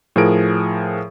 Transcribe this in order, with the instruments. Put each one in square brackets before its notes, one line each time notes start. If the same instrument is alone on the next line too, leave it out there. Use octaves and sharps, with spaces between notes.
[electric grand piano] A2 F3 G#4 A#4 D7